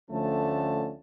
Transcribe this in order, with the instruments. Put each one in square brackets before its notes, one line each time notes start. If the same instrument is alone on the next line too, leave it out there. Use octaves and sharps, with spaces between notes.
[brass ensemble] D2 D3 F3 A3 C#4 A5